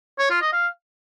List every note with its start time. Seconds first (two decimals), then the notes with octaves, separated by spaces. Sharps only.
0.19 C#5
0.30 F4
0.41 D#5
0.53 F5